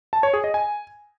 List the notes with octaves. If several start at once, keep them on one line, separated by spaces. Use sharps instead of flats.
A5
C#5
G#4
D#5
G#5